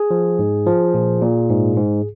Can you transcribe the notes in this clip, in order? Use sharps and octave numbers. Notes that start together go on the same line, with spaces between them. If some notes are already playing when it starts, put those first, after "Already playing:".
Already playing: G#4
F3
G#2
F3
A#2
A#2
G#2
G#2